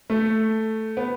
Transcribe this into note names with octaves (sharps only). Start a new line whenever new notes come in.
A3
B3